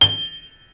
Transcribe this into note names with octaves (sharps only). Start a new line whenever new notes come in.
G7